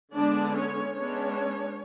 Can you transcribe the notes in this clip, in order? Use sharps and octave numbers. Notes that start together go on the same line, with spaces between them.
D3 G#3 B3 D4 D5
C#4 C#5
G#3 B3 C#4 D4 C#5